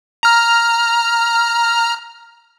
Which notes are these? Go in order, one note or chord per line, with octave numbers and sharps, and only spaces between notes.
A#5 F6